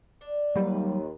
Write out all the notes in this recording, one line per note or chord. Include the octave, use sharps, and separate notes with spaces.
D4
D#2 F#3 G3 F4 B4